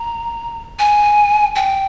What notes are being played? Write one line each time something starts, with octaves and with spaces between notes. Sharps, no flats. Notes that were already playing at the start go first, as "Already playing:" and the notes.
Already playing: A#5
G#5
G5